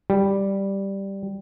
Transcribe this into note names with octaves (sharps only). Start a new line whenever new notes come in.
G3